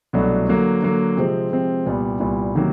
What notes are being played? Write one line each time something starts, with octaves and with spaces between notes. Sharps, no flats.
C2 B2 F#3 A3 D4
D3 F#3 A#3
D3 F#3 A#3
C3 F3 G#3 C4
C3 F3 G#3 C4
C2 A#2 G3 B3
C2 A#2 G3 B3
C3 D#3 F#3 A#3